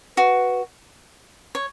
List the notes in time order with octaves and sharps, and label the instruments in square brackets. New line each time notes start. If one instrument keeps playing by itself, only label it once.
[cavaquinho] F#4 [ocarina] B4
[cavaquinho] C#5